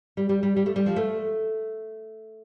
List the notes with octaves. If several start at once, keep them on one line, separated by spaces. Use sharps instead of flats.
G3
G3
G3
G3
A3
G3
F3
A3